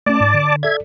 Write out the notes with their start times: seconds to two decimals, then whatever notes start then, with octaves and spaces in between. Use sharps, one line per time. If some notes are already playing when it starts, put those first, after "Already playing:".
0.06 A3 C#4 D5 A5 D6
0.21 G#2
0.34 D3
0.63 A4 D5 E5 G#6